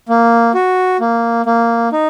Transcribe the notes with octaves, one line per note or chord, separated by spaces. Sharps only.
A#3
F#4
A#3
A#3
D#4